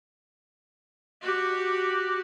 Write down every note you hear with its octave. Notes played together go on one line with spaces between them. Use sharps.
F#4 G4